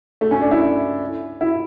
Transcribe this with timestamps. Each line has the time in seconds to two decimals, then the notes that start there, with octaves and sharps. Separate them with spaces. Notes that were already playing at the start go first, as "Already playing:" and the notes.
0.21 A3
0.31 C#4
0.41 D4
0.51 E4
1.41 E4